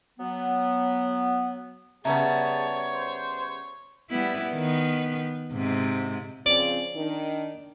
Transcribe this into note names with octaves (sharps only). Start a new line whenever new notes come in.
F#3 B3
C#3 G3 B3 G#4 C#5 E5 A5 A#5
C5
G3 B3 E4
D#3 B3
G#2 C3
C#3 F3 C4 D5
D#3 D4